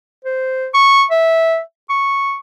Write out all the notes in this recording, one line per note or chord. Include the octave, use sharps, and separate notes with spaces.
C5
C#6
E5
C#6